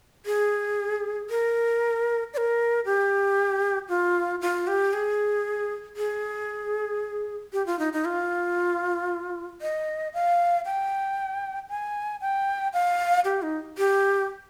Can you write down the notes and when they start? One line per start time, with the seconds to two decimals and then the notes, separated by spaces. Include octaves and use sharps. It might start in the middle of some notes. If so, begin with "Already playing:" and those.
0.26 G#4
1.30 A#4
2.33 D5
2.37 A#4
2.85 G4
3.89 F4
4.41 F4
4.67 G4
4.93 G#4
5.97 G#4
7.53 G4
7.67 F4
7.79 D#4
7.93 D#4
8.05 F4
9.62 D#5
10.14 F5
10.65 G5
11.69 G#5
12.21 G5
12.73 F5
13.25 G4
13.42 D#4
13.78 G4